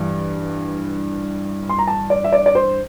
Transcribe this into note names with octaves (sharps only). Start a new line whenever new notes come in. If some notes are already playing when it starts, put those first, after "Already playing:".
Already playing: G2 E3
C6
A#5
A5
D5
E5
D5
D5
C5